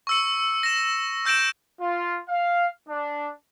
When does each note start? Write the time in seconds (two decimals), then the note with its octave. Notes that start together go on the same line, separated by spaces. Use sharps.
0.07 C#6 E6 C#7
0.63 A#6 E7
1.25 E6 G6 A#6 D7 E7
1.80 F4
2.29 F5
2.87 D4